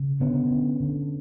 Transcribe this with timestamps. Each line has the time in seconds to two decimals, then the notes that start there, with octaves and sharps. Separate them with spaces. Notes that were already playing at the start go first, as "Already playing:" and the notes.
Already playing: C#3
0.20 D3 B3 C#4
0.50 D3
0.80 D3